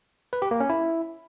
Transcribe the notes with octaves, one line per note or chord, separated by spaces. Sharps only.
B4
G4
A#3
C#4
E4